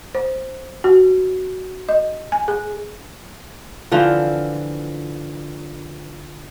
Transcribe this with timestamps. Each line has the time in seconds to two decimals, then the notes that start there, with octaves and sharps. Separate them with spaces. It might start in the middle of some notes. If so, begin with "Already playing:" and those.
0.15 C5
0.84 F#4
1.89 D#5
2.32 G#5
2.48 G#4
3.91 D3 E3 F3 F4